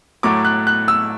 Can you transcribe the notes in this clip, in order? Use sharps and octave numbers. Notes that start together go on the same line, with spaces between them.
A2 F#3 A3 D6
F#6
F#6
E6